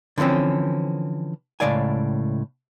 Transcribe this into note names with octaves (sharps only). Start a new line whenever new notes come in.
D3 E3 F3 C4 C#4
C#2 A2 C#3 D5 F5 G#5